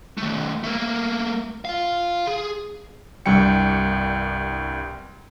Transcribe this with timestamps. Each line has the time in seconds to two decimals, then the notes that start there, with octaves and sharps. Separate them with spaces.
0.17 D#3 A3
0.63 A3 A#3
1.65 F4 F5
2.27 G#4
3.26 C2 G2 G3 G5 C#7